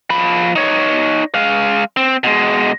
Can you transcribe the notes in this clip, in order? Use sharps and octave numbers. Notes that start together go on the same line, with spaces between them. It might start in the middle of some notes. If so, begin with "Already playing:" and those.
F3 B5
D#4 C#5
G#3 F5
C4
B2 G#3